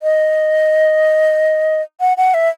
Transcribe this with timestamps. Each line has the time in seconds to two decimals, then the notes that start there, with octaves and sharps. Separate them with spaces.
0.03 D#5
2.00 F#5
2.17 F#5
2.34 E5